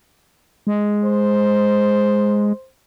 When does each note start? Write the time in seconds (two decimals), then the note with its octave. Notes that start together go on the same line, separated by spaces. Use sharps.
0.67 G#3
1.04 C5